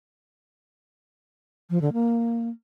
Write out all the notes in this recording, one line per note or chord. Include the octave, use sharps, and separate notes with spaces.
F3
D3
A#3